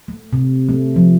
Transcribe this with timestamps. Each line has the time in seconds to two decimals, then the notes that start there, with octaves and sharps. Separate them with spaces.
0.08 A3
0.33 C3
0.69 A3
0.96 F3